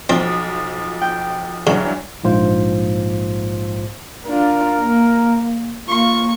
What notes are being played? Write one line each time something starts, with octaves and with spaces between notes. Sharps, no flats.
B1 F3 C4
G5
G2 C#3 E3 F#3
A#1 G#2 F4 C5
D4 F4 A#4
A#3
A#3 F4 C#6